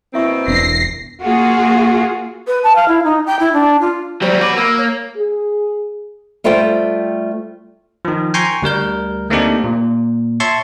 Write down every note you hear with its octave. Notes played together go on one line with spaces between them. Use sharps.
B2 A#3 C4 E4 E5 C#6
E1 B3 D4 A#6 C7
A#3 F4 F#4 G#4
B4
A5
F5
E4
D#4
G5
E4
D4
F4
F#3 G3 C5
F#4 B4 D6
A#3 E6
C#5
G#4
G3 A3 F4 A4 C5 G5
D#3 F3
G5 G#5 A#5 C6 C#6 G6
D2 G3 A#4 G6
A3 A#3 C4 D4 D#4 G4
A#2
C#5 E5 A5 C6 C#6